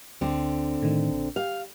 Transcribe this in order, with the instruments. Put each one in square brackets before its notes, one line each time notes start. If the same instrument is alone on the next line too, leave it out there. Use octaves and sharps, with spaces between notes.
[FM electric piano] D2 [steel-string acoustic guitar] D3 C4
[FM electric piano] A2 D#3
A#1
[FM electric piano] G4 [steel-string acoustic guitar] F5